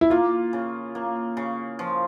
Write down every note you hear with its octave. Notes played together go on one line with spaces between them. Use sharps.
E4
A#3 F4
C#3
A#3
C#3
F3